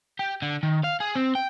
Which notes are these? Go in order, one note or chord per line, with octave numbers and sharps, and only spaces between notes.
G4
D3
D#3
F5
G#4
C4
G5